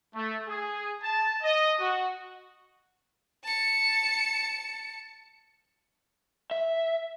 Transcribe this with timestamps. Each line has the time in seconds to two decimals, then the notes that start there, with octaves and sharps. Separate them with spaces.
0.15 A3
0.49 G#4
1.03 A5
1.42 D#5
1.79 F#4
3.43 A5 C#7
6.51 E5